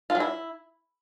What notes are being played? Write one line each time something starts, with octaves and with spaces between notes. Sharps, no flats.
F4
F#3
E4